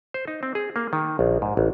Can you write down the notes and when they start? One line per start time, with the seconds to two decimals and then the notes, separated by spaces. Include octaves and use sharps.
0.14 C5
0.28 D#4
0.43 C4
0.55 G#4
0.76 A#3
0.93 D#3
1.19 A#1
1.42 G#2
1.57 A1